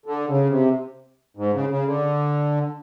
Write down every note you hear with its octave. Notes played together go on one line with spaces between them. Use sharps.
D3
C#3
C3
G#2
C#3
C#3
D3